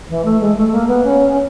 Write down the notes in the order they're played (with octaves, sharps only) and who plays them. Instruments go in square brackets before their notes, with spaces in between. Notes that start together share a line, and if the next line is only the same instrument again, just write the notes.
[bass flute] E3
A3
G#3
A3
A#3
B3
C#4